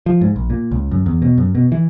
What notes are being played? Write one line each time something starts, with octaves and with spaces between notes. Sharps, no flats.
F3
G#2
A#1
A#2
C#2
F#2
E2
B2
F#2
B2
E3